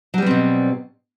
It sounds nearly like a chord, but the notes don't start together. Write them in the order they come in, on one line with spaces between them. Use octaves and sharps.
F#3 G3 B3 C4 B2